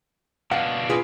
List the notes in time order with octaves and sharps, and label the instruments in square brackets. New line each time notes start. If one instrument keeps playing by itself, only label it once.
[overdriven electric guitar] B2 D4 [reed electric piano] F5 [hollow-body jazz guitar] F#5
[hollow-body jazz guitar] F4 G#4 B4